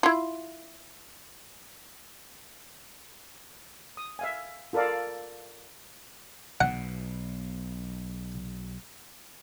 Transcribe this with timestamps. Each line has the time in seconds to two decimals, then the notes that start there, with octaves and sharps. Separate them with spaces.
0.03 E4 F4
3.97 D#6
4.19 E5 F5 G#5
4.73 F4 A4 A#4 D5 F5
6.61 B1 B2 F#5